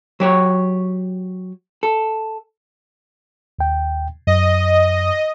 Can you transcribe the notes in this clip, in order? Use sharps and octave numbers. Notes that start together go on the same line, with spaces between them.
F#3 G4 C#5
A4
D#2 G5
F#2 D#5